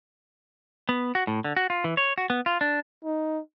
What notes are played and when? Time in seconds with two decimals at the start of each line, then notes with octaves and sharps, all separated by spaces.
0.89 B3
1.15 F#4
1.27 A2
1.44 D3
1.57 F#4
1.70 F4
1.84 E3
1.97 C#5
2.18 F#4
2.30 B3
2.46 F4
2.61 D4
3.04 D#4